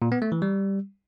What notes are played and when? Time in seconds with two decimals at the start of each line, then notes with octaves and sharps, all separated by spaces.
0.02 A#2
0.12 B3
0.22 A3
0.32 E3
0.42 G3